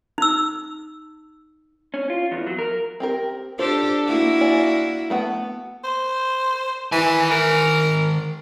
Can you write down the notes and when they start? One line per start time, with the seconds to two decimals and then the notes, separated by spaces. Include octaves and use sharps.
0.18 D#4 E6
1.94 C#4
2.10 F4
2.32 E2
2.47 F#3
2.59 A#4
3.00 C4 G4 A#4
3.59 D4 F4 G4 A4 C5
4.06 A#3 E4 F#4
4.41 D5 G#5
5.10 A3 B3 F#5
5.84 C5
6.92 D#3 E3 G#5
7.31 A#4